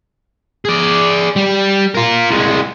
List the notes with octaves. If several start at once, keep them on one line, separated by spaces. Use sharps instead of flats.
G#4 D5
G3
F4 A#4
C2 G#3